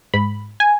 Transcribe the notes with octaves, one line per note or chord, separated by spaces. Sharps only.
G#2 B5
G#5